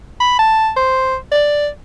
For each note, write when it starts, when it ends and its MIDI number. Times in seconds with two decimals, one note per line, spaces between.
0.20 0.38 83
0.39 0.71 81
0.76 1.16 72
1.32 1.68 74